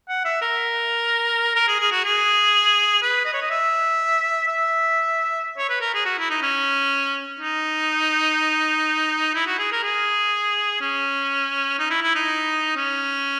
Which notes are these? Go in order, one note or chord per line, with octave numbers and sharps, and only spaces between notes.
F#5
E5
A#4
A#4
G#4
G#4
F#4
G#4
B4
D#5
C#5
D#5
E5
E5
C#5
B4
A#4
G#4
F#4
E4
D#4
C#4
D#4
E4
F#4
G#4
A#4
G#4
C#4
D#4
E4
E4
D#4
C#4